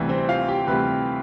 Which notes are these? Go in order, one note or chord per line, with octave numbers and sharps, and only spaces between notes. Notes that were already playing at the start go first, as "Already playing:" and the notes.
Already playing: D2 C3 E3 G3
C4 C5
F4 F5
G4 G5
D2 C3 E3 G3 B4 B5